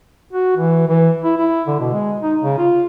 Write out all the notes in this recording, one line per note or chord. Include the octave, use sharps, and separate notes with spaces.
F#4
E3
E3
E4
E4
D3
B2
G#3
D#4
C#3
F4